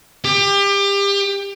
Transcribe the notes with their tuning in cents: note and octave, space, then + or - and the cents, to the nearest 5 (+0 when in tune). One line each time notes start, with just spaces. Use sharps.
G4 +30